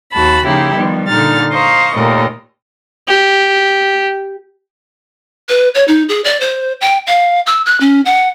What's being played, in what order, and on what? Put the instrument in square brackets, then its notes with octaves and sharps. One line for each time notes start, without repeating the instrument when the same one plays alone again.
[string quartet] D#2 F#4 A5 B5
C#3 F3 A#3 D#4 E4 G4
D#3 F3 G3 B3
A#2 D3 D#4 F6 A6
C5 D#5 F5 A#5 C#6
D#2 A#2 A3 A#4 D#5
[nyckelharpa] G4
[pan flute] B4
C#5
D#4
G#4
D5
C5
G5
F5
E6
F#6
C#4
F#5